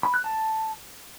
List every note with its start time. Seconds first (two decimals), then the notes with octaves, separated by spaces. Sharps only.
0.03 B5
0.14 F#6
0.24 A5